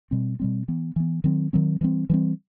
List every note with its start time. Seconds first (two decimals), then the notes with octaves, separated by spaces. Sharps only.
0.11 B2 G3 C4
0.40 B2 G3 C4
0.68 E3 B3
0.96 E3 B3
1.24 D#3 F#3 C4
1.53 D#3 F#3 C4
1.81 E3 G3 C4
2.10 E3 G3 C4